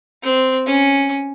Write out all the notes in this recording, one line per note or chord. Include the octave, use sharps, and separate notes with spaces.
C4
C#4